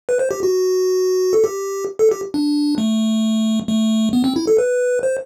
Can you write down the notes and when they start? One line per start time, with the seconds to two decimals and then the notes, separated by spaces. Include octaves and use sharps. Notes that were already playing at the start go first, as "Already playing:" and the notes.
0.09 B4
0.19 C5
0.31 G4
0.43 F#4
1.33 A4
1.44 G4
1.99 A4
2.12 G4
2.34 D4
2.78 A3
3.68 A3
4.13 B3
4.24 C4
4.36 E4
4.47 A4
4.58 B4
5.03 C5